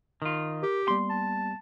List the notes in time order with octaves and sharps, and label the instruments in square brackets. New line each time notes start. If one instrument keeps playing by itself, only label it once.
[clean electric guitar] D#3 F4
[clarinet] G4 [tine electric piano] A#4
[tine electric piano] G3 A#3 B3 [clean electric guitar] C6
[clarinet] A5